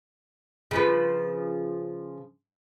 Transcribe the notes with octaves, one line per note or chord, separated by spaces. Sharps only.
C#3 F3 B4